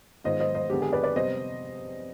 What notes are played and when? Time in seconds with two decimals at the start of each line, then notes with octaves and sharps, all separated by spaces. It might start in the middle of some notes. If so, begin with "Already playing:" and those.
0.24 G#2 D#3 B3 F4 C5 D#5
0.40 C5 D#5
0.55 C5 D#5
0.70 F2 D3 G#3 B3 G4
0.82 G#4
0.93 B4 D5
1.04 B4 D5
1.16 C3 G3 B3 C5 D#5